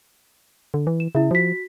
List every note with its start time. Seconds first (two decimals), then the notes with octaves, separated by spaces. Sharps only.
0.74 D3
0.87 E3
1.00 E7
1.15 C#3 E4 E5
1.31 F3 F#4 B6